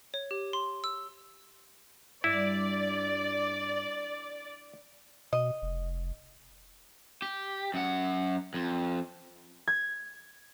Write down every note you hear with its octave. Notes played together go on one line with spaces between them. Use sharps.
C#5
G4
C6
E6
G2 E4 D5
B2 D#5
F1
G4
F#2 F#5
F2
G#6